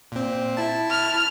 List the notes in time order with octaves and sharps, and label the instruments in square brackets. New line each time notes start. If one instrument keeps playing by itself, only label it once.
[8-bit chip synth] A#2 C4
E4 A5
[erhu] F6